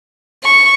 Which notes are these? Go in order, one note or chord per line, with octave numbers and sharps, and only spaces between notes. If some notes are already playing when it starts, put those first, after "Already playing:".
C#6